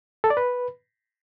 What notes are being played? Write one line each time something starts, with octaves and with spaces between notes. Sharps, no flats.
A4
D5
B4